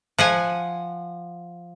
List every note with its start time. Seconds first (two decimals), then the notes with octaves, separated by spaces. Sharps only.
0.18 F3 F#5 G#5